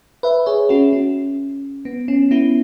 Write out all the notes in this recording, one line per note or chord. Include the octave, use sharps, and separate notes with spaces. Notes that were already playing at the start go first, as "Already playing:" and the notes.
B4 E5
G#4 C#5
C#4 F#4
C#4
B3
C#4
B3 E4